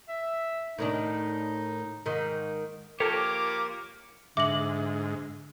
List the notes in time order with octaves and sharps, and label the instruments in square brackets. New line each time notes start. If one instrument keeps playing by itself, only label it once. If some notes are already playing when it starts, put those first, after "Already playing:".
[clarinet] E5
[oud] A2 D#3 D4 [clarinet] D#4
[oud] G#2 D#3
[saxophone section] F3 A#3 A#4 [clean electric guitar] G4 C#5 [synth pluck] A4 A5 [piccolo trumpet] D6
[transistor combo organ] G#2 [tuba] D3 [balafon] E5 [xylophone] D6 A#6 F#7